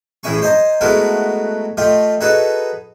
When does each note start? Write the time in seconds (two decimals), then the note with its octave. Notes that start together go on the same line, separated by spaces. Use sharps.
0.23 A1 A2 C#3 E4 G#5 C#6
0.42 C5 D#5 G#5 A#5
0.81 G#3 A3 B3 E4 F#4 A#4
1.77 A3 F4 G4 D#5
2.21 D#4 F#4 G#4 A4 B4